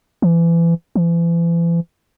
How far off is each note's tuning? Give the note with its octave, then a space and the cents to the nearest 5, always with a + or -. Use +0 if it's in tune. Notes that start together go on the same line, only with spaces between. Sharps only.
E3 +30
E3 +40